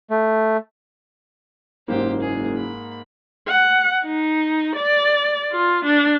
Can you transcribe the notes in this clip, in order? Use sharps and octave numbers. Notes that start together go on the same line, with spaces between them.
A3
F#1 G#2 A#3 G4 C5
G#4
B5
F#5
D#4
D5
F4
D4